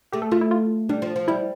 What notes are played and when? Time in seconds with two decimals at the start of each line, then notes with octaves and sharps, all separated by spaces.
0.12 A3 G4
0.22 A4
0.32 A3 F4
0.41 E4
0.51 F4
0.89 G3 D4
1.02 F3
1.16 F3
1.28 G3 E4